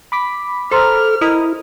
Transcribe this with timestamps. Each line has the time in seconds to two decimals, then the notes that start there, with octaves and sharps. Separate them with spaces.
0.12 B5 D6 B6
0.71 A4 C5 A#5 C6 F6
1.21 E4 A#4 D#5 D#6